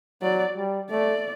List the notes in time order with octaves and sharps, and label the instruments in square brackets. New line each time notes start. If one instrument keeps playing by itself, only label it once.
[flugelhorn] F#3 [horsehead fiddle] D5
[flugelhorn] G3
[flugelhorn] A3 [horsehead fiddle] D5